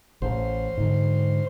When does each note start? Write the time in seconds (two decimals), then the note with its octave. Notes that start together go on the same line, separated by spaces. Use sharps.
0.22 A1 C5
0.77 G#2 D3